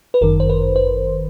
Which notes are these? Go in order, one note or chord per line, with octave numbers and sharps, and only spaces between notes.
B4
G1 F#2 D#3 A#4
C5
B4
C5